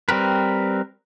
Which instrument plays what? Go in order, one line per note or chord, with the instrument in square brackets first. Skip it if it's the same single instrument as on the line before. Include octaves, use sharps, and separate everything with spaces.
[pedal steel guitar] G3 C4 A#4 B4